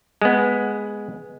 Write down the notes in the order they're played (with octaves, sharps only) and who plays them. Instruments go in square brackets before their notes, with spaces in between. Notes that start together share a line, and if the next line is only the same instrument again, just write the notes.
[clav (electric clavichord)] G#3 B3